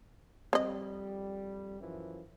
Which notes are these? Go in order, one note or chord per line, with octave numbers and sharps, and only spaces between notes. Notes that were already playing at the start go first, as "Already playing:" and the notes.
F2 G3 C4 D#5
F#2 E3 F3